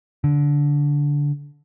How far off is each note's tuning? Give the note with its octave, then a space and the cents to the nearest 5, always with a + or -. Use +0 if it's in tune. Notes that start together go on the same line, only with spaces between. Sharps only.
D3 -15